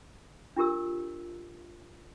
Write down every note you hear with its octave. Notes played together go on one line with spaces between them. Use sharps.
D4 F4 G4 A#4 E6